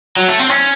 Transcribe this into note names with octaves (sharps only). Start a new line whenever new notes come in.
F#3
A3
C4
C#4